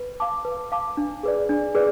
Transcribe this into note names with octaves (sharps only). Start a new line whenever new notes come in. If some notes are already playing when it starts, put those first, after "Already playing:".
Already playing: B4
F5 A5 D6
B4
F5 A5 D6
D4
G#4 B4 D5
D4
G#4 B4 D5